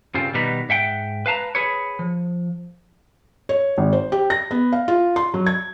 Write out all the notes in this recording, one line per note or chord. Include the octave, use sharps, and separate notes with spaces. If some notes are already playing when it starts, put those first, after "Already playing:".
C2 G2 C#3 C4 F4
B2 D#3 G3 B3 D#4 B4
G#2 E5 F#5 G5
B4 F5 A5 A#5
G#4 A4 B4 C#5
F3
C#5
G#1
C5
G4
A#6
B3
F5
F4
C6
F#3
G#6